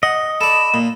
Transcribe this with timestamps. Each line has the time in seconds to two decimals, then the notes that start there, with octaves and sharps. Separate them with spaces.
0.03 D#5 F#5
0.41 A4 D5 B5 E7
0.74 A#2